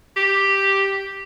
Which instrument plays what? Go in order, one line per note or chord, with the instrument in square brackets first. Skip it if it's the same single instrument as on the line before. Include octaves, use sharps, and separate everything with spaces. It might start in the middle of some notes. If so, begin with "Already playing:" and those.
[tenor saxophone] G4